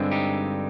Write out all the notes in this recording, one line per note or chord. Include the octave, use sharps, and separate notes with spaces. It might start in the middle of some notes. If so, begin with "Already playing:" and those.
Already playing: G2 D3 G#3 C4
D#4 G4